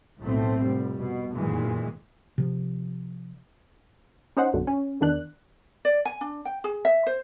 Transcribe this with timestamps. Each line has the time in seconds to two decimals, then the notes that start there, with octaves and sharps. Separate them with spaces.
0.20 B1 A2 A3 C4
0.61 F1 G3
0.96 B2
1.33 F1 F#2 A#2 D#3 E3 G#3
2.38 C3 F3
4.37 C#4 D#4 C5 F#5
4.53 B1 F#2 D3
4.67 C#4
5.01 E2 D#3 D4 F#6
5.85 D5
6.05 G#5
6.21 D4
6.45 G5
6.64 G#4
6.85 E5
7.07 C5